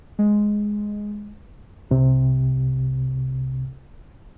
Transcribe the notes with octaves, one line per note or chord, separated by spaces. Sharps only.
G#3
C2 C3